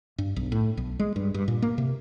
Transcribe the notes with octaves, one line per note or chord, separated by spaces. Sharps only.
G2
B1
A2
B1
G#3
G2
G2
A#2
A#3
C3